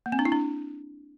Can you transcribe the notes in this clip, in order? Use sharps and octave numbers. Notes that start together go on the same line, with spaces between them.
A#3
C4
D4
E4
D4